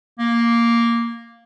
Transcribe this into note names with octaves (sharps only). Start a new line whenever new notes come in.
A#3